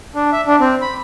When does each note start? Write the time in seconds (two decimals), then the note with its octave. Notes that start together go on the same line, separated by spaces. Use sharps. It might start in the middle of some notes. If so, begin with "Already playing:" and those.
0.15 D4
0.32 E5
0.47 D4
0.60 C4
0.82 B5